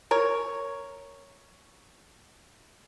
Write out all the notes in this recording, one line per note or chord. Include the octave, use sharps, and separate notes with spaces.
A#4 C#5